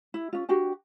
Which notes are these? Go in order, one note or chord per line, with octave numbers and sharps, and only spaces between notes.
E4
C#4 F4
D4 F#4 G4 G5